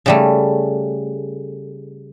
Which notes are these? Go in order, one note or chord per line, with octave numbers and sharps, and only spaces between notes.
C#3 G3 A3